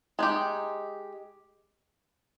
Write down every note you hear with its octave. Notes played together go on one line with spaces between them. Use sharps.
G#3 D#4 G4